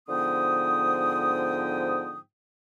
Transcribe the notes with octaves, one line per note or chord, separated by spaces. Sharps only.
G#2 D3 F3 B3 G5 D#6